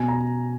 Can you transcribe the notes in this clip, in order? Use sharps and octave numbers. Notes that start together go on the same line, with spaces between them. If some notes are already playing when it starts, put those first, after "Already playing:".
Already playing: B2 G#5
A#5